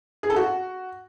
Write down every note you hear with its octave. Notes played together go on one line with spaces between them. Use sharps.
G#4
A4
F#4